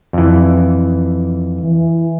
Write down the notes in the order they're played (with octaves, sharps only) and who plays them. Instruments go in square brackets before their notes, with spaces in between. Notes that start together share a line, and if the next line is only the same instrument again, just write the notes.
[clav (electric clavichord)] F2 E3
[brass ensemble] E3